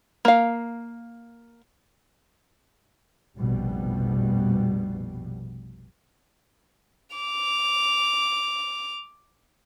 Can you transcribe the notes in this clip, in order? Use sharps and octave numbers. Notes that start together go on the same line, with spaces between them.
A#3 F5
F1 A#1 B2 G3
D6 F7